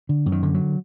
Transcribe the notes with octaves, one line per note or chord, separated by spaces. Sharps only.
D3
F#2
D#3
D3
F#3